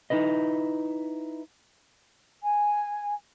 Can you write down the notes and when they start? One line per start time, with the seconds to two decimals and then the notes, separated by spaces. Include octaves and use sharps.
0.10 D#4 E4 B4 D#5
2.43 G#5